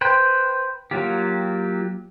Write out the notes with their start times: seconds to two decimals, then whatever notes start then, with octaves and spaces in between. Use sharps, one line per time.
0.01 B4 C5 G5
0.91 F#3 A#3 F4 G4